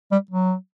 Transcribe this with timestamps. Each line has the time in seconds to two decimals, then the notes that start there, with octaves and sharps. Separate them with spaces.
0.12 G3
0.31 F#3